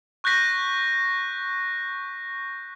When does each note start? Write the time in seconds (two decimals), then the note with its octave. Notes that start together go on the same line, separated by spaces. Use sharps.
0.24 C#6 F#6 G6 A#6 B6